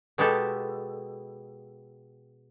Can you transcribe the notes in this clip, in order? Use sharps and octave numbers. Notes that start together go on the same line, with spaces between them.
B2 G#3 B3 G4 A4